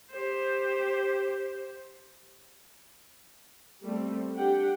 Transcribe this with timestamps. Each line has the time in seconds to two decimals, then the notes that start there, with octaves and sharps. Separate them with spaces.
0.11 G4 C5
3.83 G3 A3 C4
4.35 D4 G4 F#5 G5